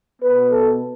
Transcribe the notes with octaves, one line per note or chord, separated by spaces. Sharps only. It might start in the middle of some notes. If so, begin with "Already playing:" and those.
B2 B3 B4
A4